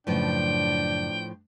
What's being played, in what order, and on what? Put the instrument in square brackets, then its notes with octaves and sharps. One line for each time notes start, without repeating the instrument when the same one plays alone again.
[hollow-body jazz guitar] F#2 C#3 [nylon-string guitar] A2 F3 B4 [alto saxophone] D4 [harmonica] G5